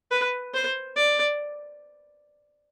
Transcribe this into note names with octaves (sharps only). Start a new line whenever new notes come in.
B4
C5
D5